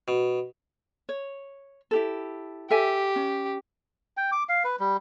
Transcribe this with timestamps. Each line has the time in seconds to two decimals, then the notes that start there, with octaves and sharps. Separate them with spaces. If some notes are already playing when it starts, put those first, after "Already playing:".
0.08 B2
1.09 C#5
1.91 E4 G4 A4
2.70 G4 A4 E5 G#5
3.16 C#4
4.17 G5
4.32 D6
4.49 F5
4.64 B4
4.80 G3